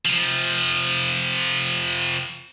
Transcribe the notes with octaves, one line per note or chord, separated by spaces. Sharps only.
C3 F3